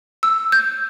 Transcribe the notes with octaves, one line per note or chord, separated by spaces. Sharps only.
E6
G6